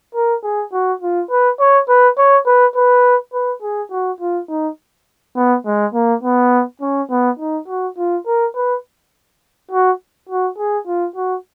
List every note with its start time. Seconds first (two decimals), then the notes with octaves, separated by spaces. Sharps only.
0.15 A#4
0.44 G#4
0.73 F#4
1.02 F4
1.30 B4
1.60 C#5
1.89 B4
2.18 C#5
2.46 B4
2.76 B4
3.33 B4
3.62 G#4
3.91 F#4
4.21 F4
4.49 D#4
5.36 B3
5.66 G#3
5.94 A#3
6.23 B3
6.81 C#4
7.10 B3
7.39 D#4
7.68 F#4
7.97 F4
8.26 A#4
8.56 B4
9.71 F#4
10.29 F#4
10.58 G#4
10.87 F4
11.16 F#4